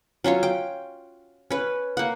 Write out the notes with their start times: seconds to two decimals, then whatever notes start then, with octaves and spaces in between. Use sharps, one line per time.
0.24 F#3 C#4 F4 C#5
0.43 G5
1.51 C#4 B4
1.97 A#3 F#5